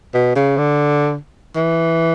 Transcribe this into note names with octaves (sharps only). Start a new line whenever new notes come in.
B2
C#3
D3
E3